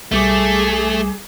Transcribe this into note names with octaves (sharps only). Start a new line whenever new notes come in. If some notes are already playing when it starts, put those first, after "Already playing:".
B1 G3 A3 G#4 D6